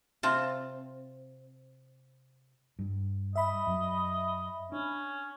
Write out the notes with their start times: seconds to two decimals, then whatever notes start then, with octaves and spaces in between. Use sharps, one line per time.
0.23 C3 C4 F4 A5
2.79 G2
3.36 D#5 E5 B5
3.67 F#2
4.72 C#4 D4